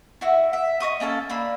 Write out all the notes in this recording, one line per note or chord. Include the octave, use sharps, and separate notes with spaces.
E4 F#4 E5
E5
D#5 E5 C#6 D#6
A#3 C#4 A4 A5
A#3 D4 B5 E6